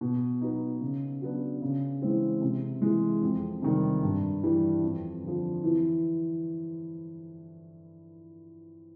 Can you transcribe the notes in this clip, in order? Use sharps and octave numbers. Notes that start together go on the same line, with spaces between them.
B2
F#3 B3 D#4
C#3
F#3 B3 D4
C#3
E3 G#3 C4
C3
E3 G#3
F2
C3 D#3 G3
G2
E3 G3
F2
D3 F3
E3